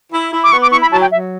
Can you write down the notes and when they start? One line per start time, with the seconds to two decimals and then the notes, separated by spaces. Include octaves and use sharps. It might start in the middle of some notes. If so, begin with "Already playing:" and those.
0.13 E4
0.32 E4
0.44 D6
0.52 B3 C#6
0.62 D6
0.72 E4 C#6
0.82 B5
0.91 F#3 A5
1.01 G5
1.11 F#3 E5